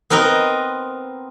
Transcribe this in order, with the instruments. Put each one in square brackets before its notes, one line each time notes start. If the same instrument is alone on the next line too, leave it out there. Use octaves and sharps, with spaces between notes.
[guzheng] B3 C4 A#4 B4 D#5